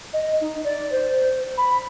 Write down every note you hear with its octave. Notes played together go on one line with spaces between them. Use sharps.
D#5
D#4
D5
C5
B5